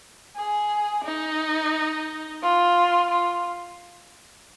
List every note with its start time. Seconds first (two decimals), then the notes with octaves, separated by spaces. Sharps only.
0.36 G#4
1.05 D#4
2.42 F4
3.10 F4